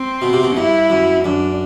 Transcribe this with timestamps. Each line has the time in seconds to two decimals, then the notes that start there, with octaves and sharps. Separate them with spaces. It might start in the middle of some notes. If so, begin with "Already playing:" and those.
Already playing: C4
0.22 B2
0.33 C3
0.43 B2
0.56 G2 E4
0.90 F#2
1.24 F#2 D4